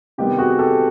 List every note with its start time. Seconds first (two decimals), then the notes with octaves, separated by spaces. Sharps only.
0.18 C3 D#3 G3 B3 G4
0.38 F#4 G#4
0.59 G4 A4